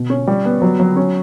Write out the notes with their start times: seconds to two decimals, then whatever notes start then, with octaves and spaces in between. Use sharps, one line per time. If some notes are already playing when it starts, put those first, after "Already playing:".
Already playing: B2
0.10 C#4
0.27 G3
0.45 B3
0.62 F#3
0.80 F#3
0.96 C#4